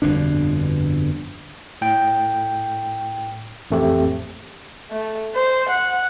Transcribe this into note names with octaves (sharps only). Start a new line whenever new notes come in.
G1 F2 B2 D4
A2 G5
A1 F2 A3 C4 G4
A3
C5
F#5